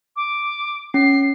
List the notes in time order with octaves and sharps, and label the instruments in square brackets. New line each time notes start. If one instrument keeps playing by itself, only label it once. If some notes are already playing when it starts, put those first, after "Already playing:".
[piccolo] D6
[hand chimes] C#4 [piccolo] C7